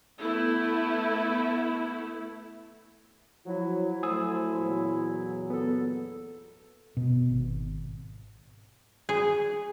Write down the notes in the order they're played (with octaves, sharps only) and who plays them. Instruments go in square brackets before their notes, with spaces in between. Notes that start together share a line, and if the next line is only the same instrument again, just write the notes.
[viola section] A3 B3 E4
[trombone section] F3 F#3 [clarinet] E4
[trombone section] F#3 A3 C5 [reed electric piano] G#5 D#6 E6
[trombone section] E2 A#2 F#3
[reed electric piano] B3 [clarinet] A4
[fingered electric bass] B2
G#1
[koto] G#4